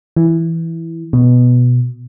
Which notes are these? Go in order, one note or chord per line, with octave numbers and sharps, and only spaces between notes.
E3
B2